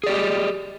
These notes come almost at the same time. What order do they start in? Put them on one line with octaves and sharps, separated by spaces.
G#4 D5 G4 D#5